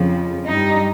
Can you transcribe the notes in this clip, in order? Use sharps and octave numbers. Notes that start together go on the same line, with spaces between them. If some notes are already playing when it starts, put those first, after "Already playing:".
Already playing: F2 C#3 F3
G2 G3 D#4